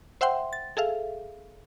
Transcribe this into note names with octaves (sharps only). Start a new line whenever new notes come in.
C5 E5 F#5 G5 C6
A6
G#4 A4 E5 F5